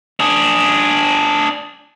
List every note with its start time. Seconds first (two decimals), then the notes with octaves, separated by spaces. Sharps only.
0.20 D4 G#4